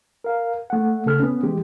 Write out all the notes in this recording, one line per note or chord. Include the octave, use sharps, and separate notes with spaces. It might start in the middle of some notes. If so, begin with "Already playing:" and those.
A#4 F5
A3 F#5
C#3 A4 F6
B3 C#4
E3 G#3 G4